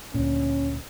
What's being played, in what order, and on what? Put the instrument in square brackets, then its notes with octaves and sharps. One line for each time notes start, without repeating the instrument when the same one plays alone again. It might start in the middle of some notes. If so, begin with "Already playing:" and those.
[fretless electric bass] D2 A#2 [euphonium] C#4